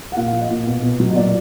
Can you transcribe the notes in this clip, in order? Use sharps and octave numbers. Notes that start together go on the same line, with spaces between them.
F#5
A#2 F5
F3
D#5
A#2
B2
B2
F#3
D#5
A#2 D5